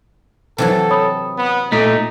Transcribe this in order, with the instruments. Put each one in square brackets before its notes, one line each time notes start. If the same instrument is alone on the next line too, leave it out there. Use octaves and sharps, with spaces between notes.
[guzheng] C3 E3 F#3 [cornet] A4
[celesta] C#5 B5 D#6
[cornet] B3
[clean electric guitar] A#2 A3 [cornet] D#4 [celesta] B6